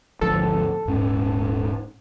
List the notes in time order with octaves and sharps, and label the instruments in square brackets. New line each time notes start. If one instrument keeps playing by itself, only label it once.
[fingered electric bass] G#1 D2 F3 [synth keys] A4
[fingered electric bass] D#1 G#2 C#4